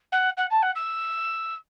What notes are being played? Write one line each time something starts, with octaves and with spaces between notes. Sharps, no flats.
F#5
F#5
A5
F#5
E6